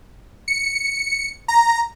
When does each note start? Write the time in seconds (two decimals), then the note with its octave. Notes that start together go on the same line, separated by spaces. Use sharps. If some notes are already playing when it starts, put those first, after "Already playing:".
0.48 C#7
1.48 A#5